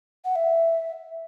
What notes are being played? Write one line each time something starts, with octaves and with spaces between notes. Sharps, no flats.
F#5
E5